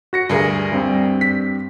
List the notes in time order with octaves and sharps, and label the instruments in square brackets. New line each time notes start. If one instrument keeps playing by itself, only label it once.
[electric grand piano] F#4 A#6 C#7
[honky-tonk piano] D2 G#4 A#4 [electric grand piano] G2
[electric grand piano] G2 G3 C4
[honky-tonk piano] B6